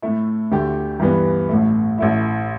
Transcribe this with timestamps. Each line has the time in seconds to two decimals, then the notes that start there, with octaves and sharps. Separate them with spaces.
0.02 A2 A3 E4
0.52 D2 D3 A3 G4
1.00 G2 E3 G3 B3
1.49 A1 A2 A3
1.98 A1 A2 A3 E4